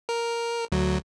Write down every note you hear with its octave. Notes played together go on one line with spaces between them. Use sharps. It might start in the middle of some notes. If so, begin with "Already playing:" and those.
A#4
D2 F#3